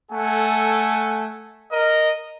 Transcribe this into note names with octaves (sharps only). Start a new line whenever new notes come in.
A3 A4 F#5 G#5
A#4 D#5